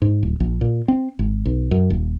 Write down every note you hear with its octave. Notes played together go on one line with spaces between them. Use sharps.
G#2
D1
A#1
A#2
C4
G#1
B1
F#2
D#1